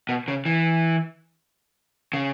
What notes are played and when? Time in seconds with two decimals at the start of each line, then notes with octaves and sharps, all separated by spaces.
0.09 B2
0.28 C#3
0.46 E3
2.13 C#3